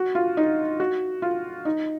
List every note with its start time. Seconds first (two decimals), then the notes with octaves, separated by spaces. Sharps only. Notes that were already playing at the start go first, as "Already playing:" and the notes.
Already playing: F#4
0.15 F4
0.37 D#4
0.80 F#4
1.22 F4
1.65 D#4